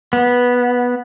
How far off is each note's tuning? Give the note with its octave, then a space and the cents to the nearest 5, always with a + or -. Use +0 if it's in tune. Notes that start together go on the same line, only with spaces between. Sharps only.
B3 -10